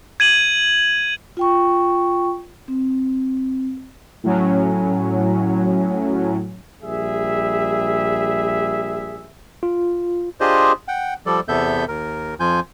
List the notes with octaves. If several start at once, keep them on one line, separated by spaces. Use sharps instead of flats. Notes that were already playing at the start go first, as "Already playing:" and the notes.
G#6 D#7 F#7
F4 G5 C#6
C4
A2 F#3 C#4
A#1 G3 G#4 E5
F4
D4 F4 G4 G#4 C5 D#5
F#5 G5
F3 G3 A4 D5
E2 C3 B3 A4 E5 G6
D#2 A#4
F2 F3 F4 G#5 G6